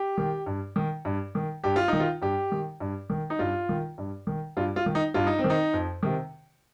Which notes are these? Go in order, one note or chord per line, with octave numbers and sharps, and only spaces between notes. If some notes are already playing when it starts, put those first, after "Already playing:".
Already playing: G4
D#3
G2
D#3
G2
D#3
G2 G4
F4
D#3 D#4
F4
G2 G4
D#3
G2
D#3
D#4
G2 F4
D#3
G2
D#3
G2 F4
F4
D#3
D#4
G2 F4
D#4
C4
D#3
D#4
F2
C3 D#3